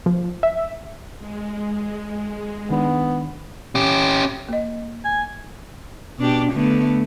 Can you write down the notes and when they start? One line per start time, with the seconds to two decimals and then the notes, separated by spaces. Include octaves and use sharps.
0.06 F3
0.43 E5
1.17 G#3
2.70 D#3 B3 D4
3.75 C#4 G4
4.49 A#3 D#5
5.05 G#5
6.18 B2 D4 G4
6.52 D3 A3 B3